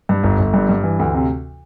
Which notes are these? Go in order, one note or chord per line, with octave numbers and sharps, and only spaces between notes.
G2
G1
G1
G2
G2
E3
D2
C3